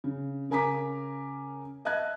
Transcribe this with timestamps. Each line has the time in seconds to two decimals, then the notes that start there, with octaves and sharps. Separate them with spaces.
0.04 C#3
0.50 C#3 A#4 G#5 A#5 D6 B6
1.85 D#5 E5 A5 F#6 G#6